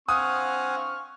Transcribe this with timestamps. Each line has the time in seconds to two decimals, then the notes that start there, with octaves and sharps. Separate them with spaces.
0.09 C4 F5 F#5 G#5 C#6 D#6 F6